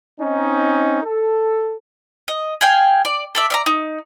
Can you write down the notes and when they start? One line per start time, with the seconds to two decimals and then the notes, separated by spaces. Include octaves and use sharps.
0.20 C4 C#4 D#4
1.03 A4
2.28 D#5
2.61 G#4 F5 G5 G#5
3.05 D5
3.35 A4 D5 E5
3.50 D5 E5 A#5
3.66 D#4